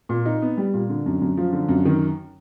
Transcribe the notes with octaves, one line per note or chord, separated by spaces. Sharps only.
A#2
D#4
B3
G3
A#2
D3
F#2
F#2
F3
D3
F#2
D#3